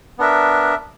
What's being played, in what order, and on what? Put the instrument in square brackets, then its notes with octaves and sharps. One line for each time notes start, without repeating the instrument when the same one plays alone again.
[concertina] B3 D4 A#4 E5